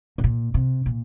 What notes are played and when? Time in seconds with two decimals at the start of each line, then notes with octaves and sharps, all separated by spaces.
0.18 B2
0.24 A#2
0.54 C3
0.86 A#2